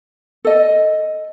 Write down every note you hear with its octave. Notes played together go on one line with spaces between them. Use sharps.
A4 D#5